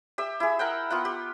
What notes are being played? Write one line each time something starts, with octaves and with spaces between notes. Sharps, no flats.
G4 E5 E6
E4 G#4
A#4 F#5 G5
B3 F4 F#5
G4